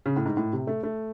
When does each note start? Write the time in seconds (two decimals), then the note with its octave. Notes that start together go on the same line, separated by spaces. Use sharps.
0.06 C#3
0.17 A2
0.26 G#2
0.37 A2
0.53 C3
0.67 A3
0.83 A3